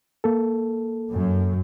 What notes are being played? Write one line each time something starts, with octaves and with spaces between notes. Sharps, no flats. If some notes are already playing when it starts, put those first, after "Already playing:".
A#3 A4
F#2